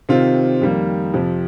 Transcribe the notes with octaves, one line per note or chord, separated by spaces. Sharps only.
C3 D#3 C4 F4
F2 D#3 G3 A#3
F2 C3 F3